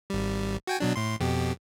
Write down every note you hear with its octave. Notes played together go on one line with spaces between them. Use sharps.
G#1 G3
F#4 G5 G#5
B2 F#3 D4
A2 C6
F2 B2 G4